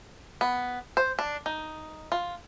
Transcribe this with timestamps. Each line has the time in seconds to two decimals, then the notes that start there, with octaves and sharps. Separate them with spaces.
0.41 B3
0.97 C5
1.19 D4
1.46 D#4
2.12 F4